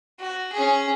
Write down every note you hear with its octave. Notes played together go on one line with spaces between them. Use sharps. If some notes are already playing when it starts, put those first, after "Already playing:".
F#4
C#4 G#4